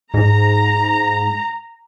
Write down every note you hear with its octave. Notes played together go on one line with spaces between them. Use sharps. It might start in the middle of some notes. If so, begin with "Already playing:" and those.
G#2 A#5